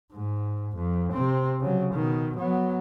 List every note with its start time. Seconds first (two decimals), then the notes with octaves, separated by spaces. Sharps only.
0.13 G#2
0.76 F2
1.12 C3 C4
1.61 C#3 F#3
1.94 B2 D#3
2.36 F#3 B3